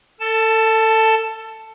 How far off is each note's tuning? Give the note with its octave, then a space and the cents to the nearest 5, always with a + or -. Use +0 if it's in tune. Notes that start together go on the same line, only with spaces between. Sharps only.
A4 +25 A5 +0